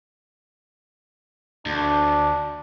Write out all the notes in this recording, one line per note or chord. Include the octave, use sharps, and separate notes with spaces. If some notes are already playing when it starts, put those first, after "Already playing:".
D2 D4